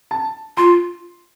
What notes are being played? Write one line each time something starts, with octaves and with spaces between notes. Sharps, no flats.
A5
F4 C6